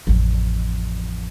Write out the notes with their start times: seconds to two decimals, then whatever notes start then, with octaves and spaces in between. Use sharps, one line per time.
0.07 A1 F2